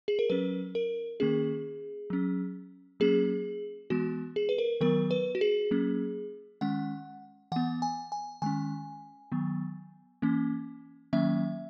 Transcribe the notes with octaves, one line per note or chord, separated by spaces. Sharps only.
G#4
A#4
F#3 C#4 B4
A#4
D#3 A#3 C#4 G#4
F#3 C#4
F#3 A#3 C#4 G#4
E3 G#3 B3 F#4
G#4
B4
A#4
D#3 F#3 B3 A#4
B4
F#4
G#4
F#3 A#3 C#4
D#3 G#3 C#4 F#5
E3 B3 F#5
G#5
G#5
D#3 G#3 C#4 G#5
D#3 F#3 B3
E3 A#3 C#4
D#3 F#3 A#3 C#4 E5